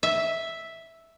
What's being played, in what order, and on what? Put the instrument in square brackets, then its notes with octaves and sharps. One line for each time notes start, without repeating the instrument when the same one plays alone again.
[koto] E5